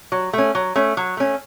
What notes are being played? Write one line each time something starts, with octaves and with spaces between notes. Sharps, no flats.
F#3
A3 C#4
F#3
A3 C#4
F#3
A3 C#4